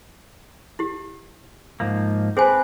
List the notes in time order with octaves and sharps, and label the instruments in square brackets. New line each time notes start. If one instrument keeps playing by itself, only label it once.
[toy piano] E4 G4
[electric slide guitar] G#2 F3 A#3
[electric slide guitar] C4 B4 [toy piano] G#4 C5 G#5